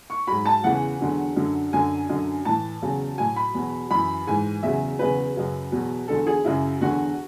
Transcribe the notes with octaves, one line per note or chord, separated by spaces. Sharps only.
C#6
G#2 F#3 B5
A5
E2 C#3 E3 F#5
E2 D3 F#3
F#2 D3 F#3
F#2 D3 F#3 G#5
F#2 D3 F#3
A2 E3 A5
E2 C#3 F#3
A2 F#3 G#5
B5
E2 B2 F#3
F#2 E3 B5
G#2 E3 G#5
E2 C#3 F#3 E5
E2 C#3 F#3 B4
F#2 C#3 F#3
E2 B2 F#3
E2 D3 F#3 A4
G#4
F#2 C#3 F#3 E4
E2 D3 F#3 F#4